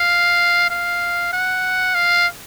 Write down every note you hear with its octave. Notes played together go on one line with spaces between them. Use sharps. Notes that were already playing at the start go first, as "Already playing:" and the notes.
Already playing: F5
F5
F#5
F5